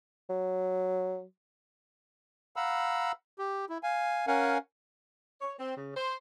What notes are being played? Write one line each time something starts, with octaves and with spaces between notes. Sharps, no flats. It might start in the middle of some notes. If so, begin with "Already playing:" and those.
F#3
F5 F#5 A#5 B5 E6
G4
E4
F5 G#5
C#4 A#4 F5 F#5 G#5
C#5
C4
C#3
C5